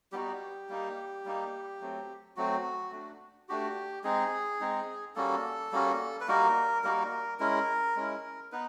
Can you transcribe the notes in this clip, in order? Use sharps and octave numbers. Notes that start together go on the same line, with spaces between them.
G3 B3 D#4 F#4 G4
G3 A#3 D#4
G3 A#3 D#4
F#3 A3 C4
F#3 A3 C4 F#4
A3 D4 F#4
A3 D4 F#4 G4
G#3 C4 D#4 G#4
G#3 C4 D#4
G3 A#3 C#4 F#4 A4
G3 A#3 C#4 F#4
B4
G3 A#3 D#4 F#4 A#4
G3 A#3 D#4 F#4 A#4
G#3 C#4 E4 A#4
G#3 C#4 E4
B3 D#4 B4